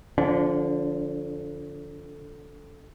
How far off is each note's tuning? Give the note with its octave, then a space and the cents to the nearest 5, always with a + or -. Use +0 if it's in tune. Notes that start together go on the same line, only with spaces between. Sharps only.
D3 +0 F3 +0 D4 -40